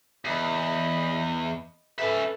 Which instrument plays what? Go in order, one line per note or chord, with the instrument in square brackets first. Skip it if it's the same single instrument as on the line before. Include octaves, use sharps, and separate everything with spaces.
[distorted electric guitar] E2 [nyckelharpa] D#5 B5
[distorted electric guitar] C#4 E5 [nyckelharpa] A4 B4